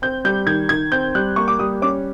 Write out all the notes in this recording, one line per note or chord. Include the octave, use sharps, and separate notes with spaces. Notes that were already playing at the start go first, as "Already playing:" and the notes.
C4 G6
G3 G6
D#3 G#6
D#3 G#6
C4 G6
G3 F#6
A#3 C#6
D6
G3 D#6
C#4 D6